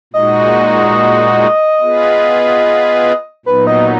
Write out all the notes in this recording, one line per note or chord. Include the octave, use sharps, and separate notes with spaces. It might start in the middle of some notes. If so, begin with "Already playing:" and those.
A#2 G#3 D#4 F#4 D#5
B3 F4 G#4 B4
A#2 F#3 B3 D#4 B4
D#5